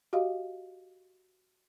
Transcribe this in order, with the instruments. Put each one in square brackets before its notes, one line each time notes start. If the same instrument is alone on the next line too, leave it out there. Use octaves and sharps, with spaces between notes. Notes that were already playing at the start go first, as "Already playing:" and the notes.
[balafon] F#4 G4 D#5 F5